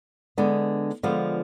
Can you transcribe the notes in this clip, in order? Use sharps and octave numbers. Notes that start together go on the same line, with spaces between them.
D3 G#3 B3 D4
D3 F3 G#3 B3 F4